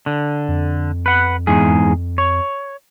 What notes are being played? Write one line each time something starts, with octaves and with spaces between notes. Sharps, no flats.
D3
F2
B4 F#5
E2 G#2 G#4
C#5